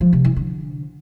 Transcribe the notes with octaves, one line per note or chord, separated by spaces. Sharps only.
F3
C3
E3
D3